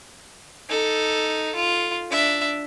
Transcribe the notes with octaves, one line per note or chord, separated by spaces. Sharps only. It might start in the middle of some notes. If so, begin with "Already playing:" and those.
D#4 A4
F4
D4 E5